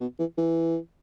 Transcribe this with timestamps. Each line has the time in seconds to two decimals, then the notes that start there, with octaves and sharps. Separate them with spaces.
0.01 B2
0.19 E3
0.38 E3